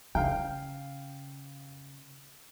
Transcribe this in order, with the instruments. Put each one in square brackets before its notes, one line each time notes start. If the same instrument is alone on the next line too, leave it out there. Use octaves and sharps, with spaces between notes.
[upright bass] C#3 [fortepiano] F5 G5